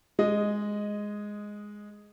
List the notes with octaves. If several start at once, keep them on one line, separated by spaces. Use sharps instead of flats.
G#3 D#5